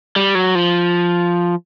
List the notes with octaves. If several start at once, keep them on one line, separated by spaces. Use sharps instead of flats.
G3
F#3
F3